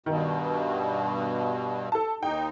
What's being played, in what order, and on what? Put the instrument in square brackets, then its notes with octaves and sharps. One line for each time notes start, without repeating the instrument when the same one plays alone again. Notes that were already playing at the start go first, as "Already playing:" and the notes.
[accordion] G2 B2 [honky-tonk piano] D#3
[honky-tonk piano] A4 A5
[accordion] D#2 D#4 [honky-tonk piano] G5